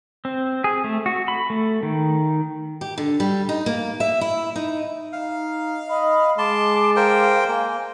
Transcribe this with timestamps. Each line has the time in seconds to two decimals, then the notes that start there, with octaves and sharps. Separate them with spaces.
0.25 C4
0.64 G#4
0.84 A3
1.06 F#4
1.28 B5
1.50 A3
1.83 D#3
2.81 G4
2.98 D3
3.20 G3
3.49 D#4
3.66 A#3
4.00 E5
4.21 E4
4.56 D#4
5.12 D#4 F5
5.89 D#5 B5
6.38 G#3 A5 C6 D6
6.96 A#4 C5 F5 G5
7.49 A#3 G#5